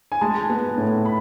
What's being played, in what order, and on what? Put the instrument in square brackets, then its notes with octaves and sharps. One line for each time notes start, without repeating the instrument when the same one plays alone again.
[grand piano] G#5
[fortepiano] G#3 [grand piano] A5
[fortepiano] B3
A2
[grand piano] B5